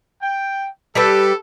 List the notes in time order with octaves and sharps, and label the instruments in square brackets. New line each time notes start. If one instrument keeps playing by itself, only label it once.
[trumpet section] G5
[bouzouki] G3 G4 B4 [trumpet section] A4